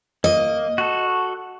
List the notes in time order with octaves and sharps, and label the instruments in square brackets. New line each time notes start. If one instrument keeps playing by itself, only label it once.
[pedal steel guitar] A#3 [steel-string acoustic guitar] D#5
[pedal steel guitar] F#4 A4